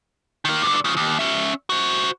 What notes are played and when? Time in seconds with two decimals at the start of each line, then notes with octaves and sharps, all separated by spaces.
0.45 D#3 A#3
0.62 G2 D3
0.85 C#3 F3
0.97 D#2
1.19 C#4 E5
1.70 F#4 C5